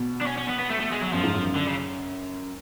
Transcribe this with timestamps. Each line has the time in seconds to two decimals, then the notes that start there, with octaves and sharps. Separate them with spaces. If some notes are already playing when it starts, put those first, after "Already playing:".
Already playing: B2
0.21 D4
0.26 C#4
0.37 C#4
0.48 B3
0.59 B3
0.70 A3
0.80 A3
0.92 G#3
1.02 F#3
1.13 F#2 F3
1.23 G#2
1.34 F#2
1.56 D3
1.67 C#3